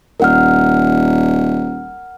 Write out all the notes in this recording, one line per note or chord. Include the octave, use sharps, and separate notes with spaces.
D#1 A#4 F#5 F6